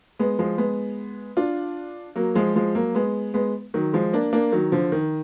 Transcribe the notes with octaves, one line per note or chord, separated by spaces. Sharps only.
G#3 B3
F3 G#3
G#3 B3
D4 F4
F#3 A#3
F3 G#3
F3 G#3
F#3 A#3
G#3 B3
G#3 B3
D#3 F#3
F3 G#3
A#3 D4
A#3 D4
D#3 F#3
D3 F3
D#3